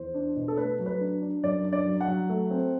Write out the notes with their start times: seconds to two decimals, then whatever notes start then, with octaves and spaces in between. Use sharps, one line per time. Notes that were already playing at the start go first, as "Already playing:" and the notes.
Already playing: E2 C5
0.14 D4
0.36 B2
0.48 A4
0.57 A3 B4
0.79 F#3
0.86 B4
1.00 D4
1.22 D4
1.43 F#2 D5
1.65 D4
1.73 D5
1.86 F#3
2.01 F#5
2.08 F#3
2.29 A3
2.51 C4